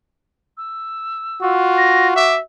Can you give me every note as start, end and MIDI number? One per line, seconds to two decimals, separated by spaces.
0.57 1.51 88
1.42 2.14 65
1.42 2.38 66
1.77 2.07 94
2.16 2.41 76
2.16 2.35 86